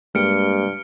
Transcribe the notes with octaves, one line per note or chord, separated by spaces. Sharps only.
G2 G#3 A#3 G4 F6 C#7 D7